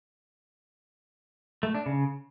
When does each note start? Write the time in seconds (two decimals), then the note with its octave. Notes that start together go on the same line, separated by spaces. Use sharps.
1.63 A3
1.75 D4
1.86 C#3